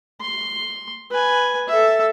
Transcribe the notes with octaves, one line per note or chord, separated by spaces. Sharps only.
C6
B4 G#5
A4 E5